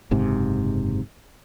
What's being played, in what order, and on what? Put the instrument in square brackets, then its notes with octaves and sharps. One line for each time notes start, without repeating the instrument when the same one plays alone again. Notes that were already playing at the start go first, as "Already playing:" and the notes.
[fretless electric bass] F#1 G#2 C3